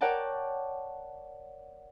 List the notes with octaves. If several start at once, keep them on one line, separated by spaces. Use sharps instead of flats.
A#4 C#5 D5 F#5 G5 A5